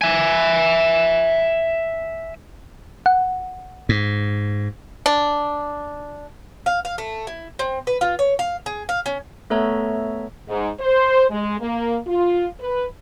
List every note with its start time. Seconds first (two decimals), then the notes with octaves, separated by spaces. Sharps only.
0.01 E5 G#5
3.06 F#5
3.89 G#2
5.06 D4
6.66 F5
6.85 F5
6.98 A3
7.27 E4
7.59 C4
7.87 B4
8.01 F4
8.19 C#5
8.39 F5
8.66 G#4
8.89 F5
9.06 C#4
9.50 A3 B3 A4 C#5 E5 A#5
10.48 G#2
10.80 C5
11.31 G#3
11.60 A#3
12.07 F4
12.60 B4